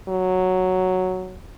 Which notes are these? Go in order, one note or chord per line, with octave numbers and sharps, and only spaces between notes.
F#3